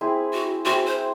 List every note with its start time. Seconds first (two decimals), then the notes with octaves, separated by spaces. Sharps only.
0.01 C4 E4 G#4
0.33 F#4
0.65 C4 E4 F#4 G#4
0.87 C5